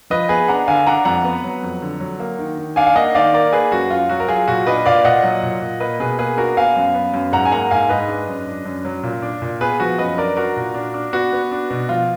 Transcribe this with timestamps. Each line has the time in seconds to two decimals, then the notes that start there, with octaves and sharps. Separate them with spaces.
0.10 F3 B4 D#5
0.29 B3 G#4 B4
0.48 D4 F#5 A#5
0.68 D3 F5 G#5
0.87 D4 F#5 A#5
1.05 F2 F#5 A#5
1.24 B3
1.44 F#3
1.63 F2
1.82 D3
2.00 F#3
2.20 A#3
2.39 D#3
2.58 D#3
2.76 D4 F5 G#5
2.86 F5
2.95 A#3 D#5 F#5
3.15 D#3 D5 F5
3.34 A#3 A#4 D5
3.53 A#3 G#4 B4
3.72 F#2 F#4
3.90 F#2 F4
4.09 F#3 F#4
4.20 A#4
4.28 F#3 F4 G#4
4.48 A#2 F#4
4.67 D4 B4 D#5
4.86 A#2 D5 F5
5.05 A#2 D#5 F#5
5.23 F#3
5.43 A#2
5.62 A#2
5.80 A#3 B4 D#5
6.00 B2 G#4 B4
6.19 A#3 G#4 B4
6.37 D4 F#4 A#4
6.57 B3 F5 G#5
6.76 F#2
6.94 B3
7.14 F#2
7.32 G#2 F#5 A#5
7.45 G#5
7.51 A#3 F#5 A#5
7.71 G#2 F5 G#5
7.89 G#2 B4 D#5
8.08 D4
8.28 F#2
8.47 D4
8.66 F#2
8.85 F#3
9.03 A#2
9.22 D4
9.42 A#2
9.61 B3 G#4 B4
9.80 F3 F#4
9.98 F#2 B4 D#5
10.18 D4 A#4 D5
10.37 D4 F#4 A#4
10.57 A#2
10.74 D4
10.94 D4
11.13 B3 F#4
11.33 B3
11.52 D4
11.70 B2
11.89 F3 F4